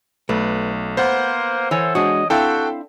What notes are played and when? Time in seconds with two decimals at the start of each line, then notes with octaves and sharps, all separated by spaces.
0.29 B1 A3 B4
0.97 A#3 B3 C5 F#5
1.71 E3 A4 C#5 G#5
1.95 G#3 D4 F#4 D#5
2.30 C4 D4 E4 F#4 A4 F5 G5